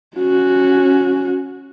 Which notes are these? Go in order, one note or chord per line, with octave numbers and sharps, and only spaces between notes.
C#4 F#4